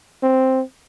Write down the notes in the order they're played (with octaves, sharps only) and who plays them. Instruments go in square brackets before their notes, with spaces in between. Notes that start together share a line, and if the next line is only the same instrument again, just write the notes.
[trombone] C4